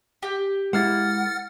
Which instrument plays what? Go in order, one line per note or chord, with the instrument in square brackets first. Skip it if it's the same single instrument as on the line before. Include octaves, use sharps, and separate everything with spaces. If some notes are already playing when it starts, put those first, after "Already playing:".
[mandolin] G4
[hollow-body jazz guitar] G#3 A#3 E4 [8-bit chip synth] F#5 F6 A6